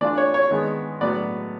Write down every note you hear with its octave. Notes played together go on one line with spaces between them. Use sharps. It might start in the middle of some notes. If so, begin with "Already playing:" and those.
E3 A3 D4 F4 D5
C#5
C#5
D#3 G#3 B3
A2 F#3 B3 D5